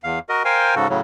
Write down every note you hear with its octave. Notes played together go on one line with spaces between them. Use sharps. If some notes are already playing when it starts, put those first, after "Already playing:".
E2 F5
F#4 A#4 D#5
A#4 C5 F5 G5 G#5
G#2 C#3 F#4 A4
A2 C#3 F#3